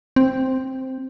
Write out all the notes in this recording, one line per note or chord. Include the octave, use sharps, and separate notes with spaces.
C4